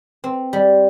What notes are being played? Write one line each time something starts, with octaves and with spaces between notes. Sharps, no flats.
C4
G3